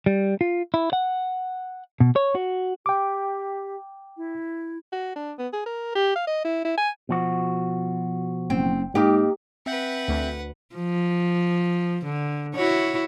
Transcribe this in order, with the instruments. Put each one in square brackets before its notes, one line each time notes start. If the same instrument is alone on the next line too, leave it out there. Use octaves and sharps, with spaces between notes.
[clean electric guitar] G3
F4
E4
F#5
B2
C#5
F#4
[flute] G4 [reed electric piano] G5 D6
[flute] E4
[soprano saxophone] F#4
D4
B3
G#4
A#4
G4
F5
D#5
E4
E4
G#5
[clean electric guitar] B2 F3 F#4
[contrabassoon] F#1 [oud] C4
[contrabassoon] G#2 [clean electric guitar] A#3 D#4 [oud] G4
[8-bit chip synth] C4 E5 G6 [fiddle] B4 F#5
[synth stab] D2
[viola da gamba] F3
D3
E4 F#4 C#5